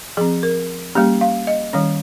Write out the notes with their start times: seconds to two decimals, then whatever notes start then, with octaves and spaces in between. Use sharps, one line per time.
0.17 F3 C4 G#4
0.43 A#4
0.95 G3 A#3 C#4 G4
1.21 F5
1.47 D#5
1.73 D#3 G3 C#4